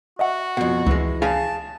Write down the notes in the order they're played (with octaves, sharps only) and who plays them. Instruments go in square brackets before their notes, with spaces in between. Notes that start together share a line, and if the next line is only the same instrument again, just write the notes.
[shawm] F#4 [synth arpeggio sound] D#5 E5 F#5
[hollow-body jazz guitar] F2 B2 [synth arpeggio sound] F#5
[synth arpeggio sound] C#2 [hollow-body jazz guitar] E3 G#3
[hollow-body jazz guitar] G#4 F5 G#5 [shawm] A5